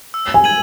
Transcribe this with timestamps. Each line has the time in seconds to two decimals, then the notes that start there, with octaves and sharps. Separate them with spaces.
0.14 E6
0.34 G#5
0.44 G#6 D#7 F#7